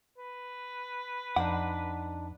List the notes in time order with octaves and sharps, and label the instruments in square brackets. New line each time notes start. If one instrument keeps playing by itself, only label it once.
[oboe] B4
[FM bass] F2 [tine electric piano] D4 D#4 D6 [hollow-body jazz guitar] F#5